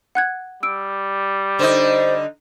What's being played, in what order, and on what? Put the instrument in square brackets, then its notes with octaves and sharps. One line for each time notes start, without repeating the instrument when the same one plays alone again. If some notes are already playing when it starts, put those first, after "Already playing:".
[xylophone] F#5 F#6 G#6
[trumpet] G3 [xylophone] E6 D7
[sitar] D3 D#4 [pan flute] C5